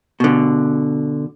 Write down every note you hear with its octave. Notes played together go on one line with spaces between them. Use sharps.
B2 D3